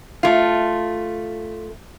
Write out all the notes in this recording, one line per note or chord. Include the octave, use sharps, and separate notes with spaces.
A3 F4